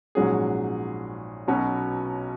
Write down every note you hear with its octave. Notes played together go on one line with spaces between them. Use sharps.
A#1 G#2 F#3 C#4 G#4
B1 B2 F#3 C#4